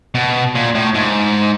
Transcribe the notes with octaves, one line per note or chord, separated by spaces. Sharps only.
B2
A#2
A2
G#2